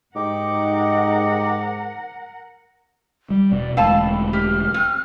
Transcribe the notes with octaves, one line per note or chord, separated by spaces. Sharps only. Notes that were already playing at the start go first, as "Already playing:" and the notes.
G#2 D#4 G4 A#4 F#5 D6
G3
E1 B2 D5
E1 D2 G#3 C4 F5 A5 B5
G4 F6
C4